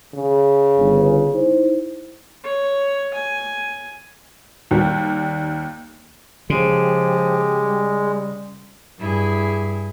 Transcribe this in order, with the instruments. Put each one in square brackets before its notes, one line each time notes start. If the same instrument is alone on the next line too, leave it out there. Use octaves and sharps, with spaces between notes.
[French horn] C#3
[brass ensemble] G1
D#4 E4 C5
[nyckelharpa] C#5
G#5
[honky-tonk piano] D#2 G3
[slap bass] C#3 [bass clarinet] F3 [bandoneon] G#3 [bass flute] G4
[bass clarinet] G3
[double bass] G2 [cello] E4 G#4